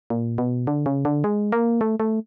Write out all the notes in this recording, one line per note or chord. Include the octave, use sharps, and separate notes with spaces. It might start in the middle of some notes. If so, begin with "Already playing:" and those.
A#2
B2
D3
C#3
D3
G#3
A#3
A3
A3